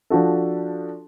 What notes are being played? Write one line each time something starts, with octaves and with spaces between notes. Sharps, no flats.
F3 D4 F#4 A4